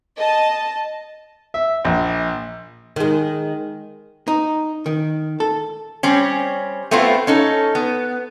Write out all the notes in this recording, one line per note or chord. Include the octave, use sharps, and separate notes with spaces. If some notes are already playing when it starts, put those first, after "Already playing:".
D#5 A5
E5
A#1
D#3 G#3
D#4
D#3
A4
G3 C4 C#4
A3 B3 C4 E4 F4
C#4 D#4 A4
B3